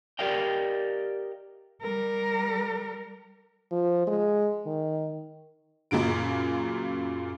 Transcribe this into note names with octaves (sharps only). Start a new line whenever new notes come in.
G4 A#4 D5 D#5 F5 G5
G3 A#4
F3
G#3
D#3
F#2 A#2 C#3 F#3 D7